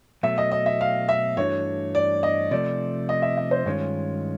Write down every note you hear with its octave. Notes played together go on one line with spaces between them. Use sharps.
B2 F#3 A3 E5
D#5
D#5
E5
F5
E5
G2 E3 A3 D4 F#4 C#5
D5
D#5
C3 F3 A3 D5
D#5
E5
E5
C5
G2 D#3 G#3 C#4 F4 C#5